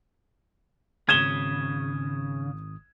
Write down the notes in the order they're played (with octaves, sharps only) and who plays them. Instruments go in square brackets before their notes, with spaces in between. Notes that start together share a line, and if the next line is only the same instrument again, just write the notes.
[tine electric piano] G#1 D#6 [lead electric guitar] C#3 [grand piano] G#6 E7 G7